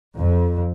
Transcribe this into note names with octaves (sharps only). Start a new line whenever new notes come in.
F2